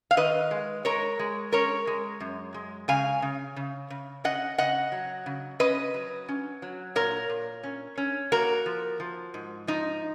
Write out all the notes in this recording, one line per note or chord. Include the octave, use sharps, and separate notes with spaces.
F5
D#3 B4 D#5
G#3
G#3 A#4 C#5
G#3
C#4 A#4 C#5
G#3
F#2
G#3
C#3 F5 G#5
C#3
C#3
C#3
C#4 D#5 F#5
C#3 D#5 F#5
F#3
C#3
C#4 B4 D#5
F#3
C#4
F#3
A#2 A#4 C#5
A#2
C#4
C#4
A#3 F#4 A#4
F3
F3
G#2
F3 D#4